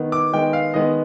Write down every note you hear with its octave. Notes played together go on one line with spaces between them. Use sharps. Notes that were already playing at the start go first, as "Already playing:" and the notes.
Already playing: D#3 B3
D6
D#3 G#3 B3 G5
F5
D#3 G#3 B3 D#5